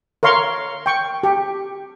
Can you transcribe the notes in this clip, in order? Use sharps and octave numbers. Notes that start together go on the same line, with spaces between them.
A#4 C#5 F5 C6 C#6
G5 C#6
G4